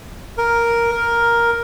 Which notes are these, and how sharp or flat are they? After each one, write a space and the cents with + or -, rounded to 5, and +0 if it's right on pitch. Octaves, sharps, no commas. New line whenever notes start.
A#4 +5
A#4 +5